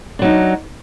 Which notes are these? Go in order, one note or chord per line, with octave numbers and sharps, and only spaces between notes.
F#3 D4 D#4